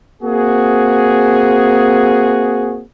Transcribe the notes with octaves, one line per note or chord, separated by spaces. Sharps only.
A#3 C4 F#4 G#4